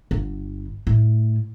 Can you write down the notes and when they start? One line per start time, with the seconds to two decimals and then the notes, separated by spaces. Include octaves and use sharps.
0.11 G1
0.87 A2